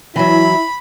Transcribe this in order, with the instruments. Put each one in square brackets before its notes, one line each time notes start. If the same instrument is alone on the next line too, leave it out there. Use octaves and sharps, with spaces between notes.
[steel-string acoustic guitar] E3 F#3 [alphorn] E4 [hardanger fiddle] B5